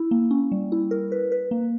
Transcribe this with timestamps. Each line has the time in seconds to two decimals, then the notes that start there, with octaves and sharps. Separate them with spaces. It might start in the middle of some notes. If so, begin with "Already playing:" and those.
Already playing: E4
0.11 A#3
0.31 C#4
0.52 G3
0.72 E4
0.91 A#4
1.12 B4
1.32 B4
1.51 A#3